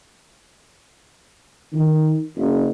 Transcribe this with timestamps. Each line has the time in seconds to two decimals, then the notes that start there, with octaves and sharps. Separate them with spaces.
1.72 D#3
2.36 F#1